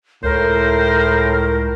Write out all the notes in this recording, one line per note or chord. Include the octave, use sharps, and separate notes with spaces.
C#2 A2 A#4 C5